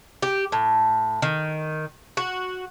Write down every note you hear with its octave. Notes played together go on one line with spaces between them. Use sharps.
G4
A2
D#3
F#4